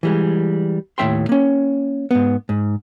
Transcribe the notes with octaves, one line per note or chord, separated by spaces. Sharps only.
E3 G3 G#3
D#2 A2 G#3 E5 G5 C6
A#3 C#4
G#2 B3
G#2